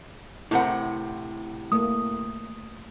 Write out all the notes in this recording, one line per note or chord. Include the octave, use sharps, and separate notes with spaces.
A2 C3 E4 A#4 C5 F#5
A3 A#3 D#6